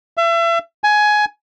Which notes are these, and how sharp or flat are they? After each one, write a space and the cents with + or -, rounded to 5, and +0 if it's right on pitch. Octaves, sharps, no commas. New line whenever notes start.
E5 +35
G#5 +15